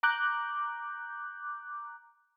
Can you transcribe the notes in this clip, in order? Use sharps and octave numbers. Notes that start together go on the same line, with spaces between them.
A#5 D6 F#6 G6